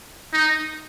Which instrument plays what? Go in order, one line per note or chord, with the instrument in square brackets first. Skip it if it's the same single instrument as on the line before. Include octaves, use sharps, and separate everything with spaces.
[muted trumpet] D#4